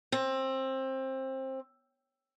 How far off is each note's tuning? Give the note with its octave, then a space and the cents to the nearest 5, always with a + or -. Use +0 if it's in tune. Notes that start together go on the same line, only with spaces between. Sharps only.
C4 +20